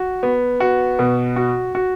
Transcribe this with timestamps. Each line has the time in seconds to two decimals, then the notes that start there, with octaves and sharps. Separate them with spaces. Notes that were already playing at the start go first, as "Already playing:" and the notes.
Already playing: F#4
0.23 B3
0.60 F#4
0.99 B2
1.36 F#4
1.75 F#4